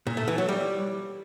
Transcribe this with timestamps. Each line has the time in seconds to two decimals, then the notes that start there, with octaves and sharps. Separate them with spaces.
0.07 A#2
0.17 A3
0.28 E3
0.38 F#3
0.49 G3